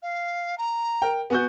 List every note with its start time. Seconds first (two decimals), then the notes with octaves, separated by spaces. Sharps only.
0.03 F5
0.58 A#5
1.02 A#4 G5
1.30 B3 F#4 G#5 G6